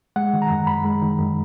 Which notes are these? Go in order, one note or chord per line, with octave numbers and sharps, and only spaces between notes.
G#3 F#5
D#3
A#5
F#2
F#2 B5
G#3
D#3
F#2